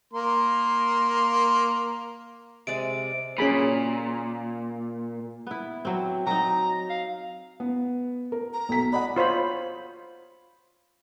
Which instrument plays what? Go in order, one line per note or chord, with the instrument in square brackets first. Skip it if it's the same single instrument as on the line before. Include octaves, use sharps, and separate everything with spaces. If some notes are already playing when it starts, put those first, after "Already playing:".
[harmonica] A#3 A#4 C6
[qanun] C3 G#3 D5 [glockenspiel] D7
[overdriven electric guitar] A#2 [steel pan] C#4 G#4 B5
[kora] B3 E4
F#3 C4
[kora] F#3 D#4 [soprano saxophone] A#5
[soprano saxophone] F5
[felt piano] B3
A#4
[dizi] A#5
[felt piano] B1 A4 B6
[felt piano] D5 D#5 F#5 [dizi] B5
[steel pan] F4 C5 C#5 B5